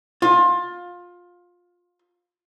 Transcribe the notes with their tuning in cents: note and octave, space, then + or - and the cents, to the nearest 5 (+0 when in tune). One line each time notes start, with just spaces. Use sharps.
F4 +20